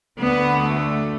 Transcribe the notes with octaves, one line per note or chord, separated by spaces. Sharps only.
D2 D3 B3
A3